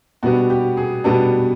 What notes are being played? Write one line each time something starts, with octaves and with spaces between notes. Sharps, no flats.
B2 G3 B3 D4 F#4
G4
G#4
B2 G3 B3 D4 A4